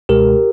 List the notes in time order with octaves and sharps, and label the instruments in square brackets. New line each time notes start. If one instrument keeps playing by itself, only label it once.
[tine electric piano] C#2 B2 G#3 G4 A#4